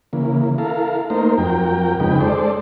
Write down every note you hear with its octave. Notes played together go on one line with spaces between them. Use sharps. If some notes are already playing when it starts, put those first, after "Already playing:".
C#3 E3 A#3
E4 A4 A#4 F5
A3 A#3 D#4 A#4 C5
F2 F#3 A#4 G5
F2 C#3 G#3 D#4 B4 G5
G#3 A4 C5 D5